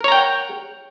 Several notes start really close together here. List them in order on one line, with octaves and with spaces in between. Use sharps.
A#4 C#5 A#5 G5 F#5